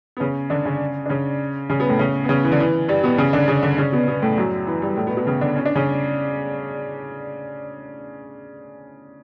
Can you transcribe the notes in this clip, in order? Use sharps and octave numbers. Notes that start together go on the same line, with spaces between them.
B3
C#3 C#4
D3 D4
C#3 C#4
D4
C#3 C#4
C#3 C#4
B2 B3
A2 A3
C#3 C#4
B3
C#3 C#4
E3
D3
E3
G2 G3
B2 B3
C#3 C#4
D3 D4
C#3 C#4
D3 D4
C#3 C#4
B2 B3
B2 B3
A2 A3
F#2 F#3
E3
G2 G3
A2 A3
B2 B3
B2 B3
C#3 C#4
D3 D4
C#4
D4
C#3 C#4